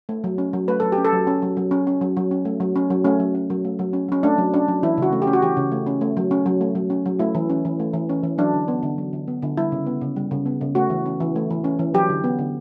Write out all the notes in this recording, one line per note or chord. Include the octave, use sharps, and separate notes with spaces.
A3
F#3
C#4
F#3
A3 B4
F#3 A4
G4
C#4
A4
F#3
C#4
F#3
F#3
C#4
C#4
F#3
F#3
C#4
A3
F#3
C#4
F#3
A3 C#4
F#3
C#4
F#3
A3
F#3
C#4
F#3 C#4
A3 D4
F#3
C#4 D4
F#3
E3 E4
C#3 F#4
A3
G4
C#4
F#4
E3 G4
C#3
A3
C#4
A3
F#3
C#4
F#3
A3
F#3
C#4
F#3
A3 E4
E3
C#4
E3
A3
E3
C#4
E3
F#3 D4
D3
B3
D3
F#3
D3
B3
D3
G3 E4
C#3
B3
C#3
G3
C#3
B3
C#3
A3 F#4
E3
C#4
E3
A3
E3
C#4
E3
F#3 G4
D3
B3
D3